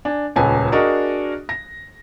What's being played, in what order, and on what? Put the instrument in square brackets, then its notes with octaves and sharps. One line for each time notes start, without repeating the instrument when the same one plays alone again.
[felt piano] D4 G#5
D#1 C#2 C#4 B4 G#5 A5
D4 F#4 G#4 A#4 D#5 C#6
A#6